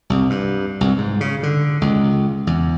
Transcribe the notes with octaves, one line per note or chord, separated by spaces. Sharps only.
C2
G2
C2
G#2
C#3
D3
C#2
E2